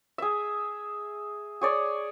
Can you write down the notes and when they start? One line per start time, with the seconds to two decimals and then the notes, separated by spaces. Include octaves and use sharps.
0.18 G#4 E5
1.61 G#4 C#5 D5